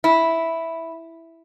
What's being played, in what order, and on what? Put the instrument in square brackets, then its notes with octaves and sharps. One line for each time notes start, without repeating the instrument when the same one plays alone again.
[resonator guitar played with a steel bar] E4